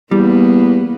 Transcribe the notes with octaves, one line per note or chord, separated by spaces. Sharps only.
E2 G3 A#3 B3